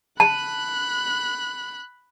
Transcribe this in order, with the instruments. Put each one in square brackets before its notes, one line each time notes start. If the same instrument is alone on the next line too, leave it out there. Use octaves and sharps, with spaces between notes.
[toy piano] A5 [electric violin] B5 F#6